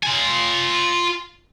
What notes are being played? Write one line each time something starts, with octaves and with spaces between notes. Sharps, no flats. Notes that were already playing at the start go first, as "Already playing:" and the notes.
F4 G#5